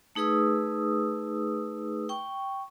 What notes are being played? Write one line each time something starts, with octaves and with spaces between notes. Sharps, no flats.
A3 D#4 G#4 B4 D#6 E6
G5 C#6